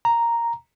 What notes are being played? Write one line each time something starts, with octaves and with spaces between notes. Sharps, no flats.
A#5